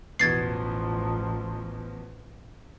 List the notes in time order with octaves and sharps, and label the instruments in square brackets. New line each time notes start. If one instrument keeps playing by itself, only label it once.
[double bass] A1 F3 [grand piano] E2 B2 [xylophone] G#6 A6 C7